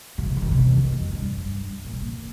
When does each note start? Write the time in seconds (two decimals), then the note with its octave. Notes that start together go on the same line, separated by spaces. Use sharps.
0.18 C#3
0.37 C#3
0.42 D#3
0.51 C3
0.59 C#3
0.77 D#3
0.95 F2
1.13 G2
1.37 G2
1.60 G2
1.84 A#2
1.93 C3
2.01 A#2